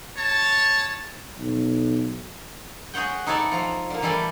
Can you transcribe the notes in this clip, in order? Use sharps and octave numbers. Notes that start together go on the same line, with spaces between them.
C#5 A5
B1
F#4 G#4 C#5 F#5 G5
D#4 E4 A4 C#5 D5 E5
F3 A#5
D3 A#3
E3 G3 E4 A4 D5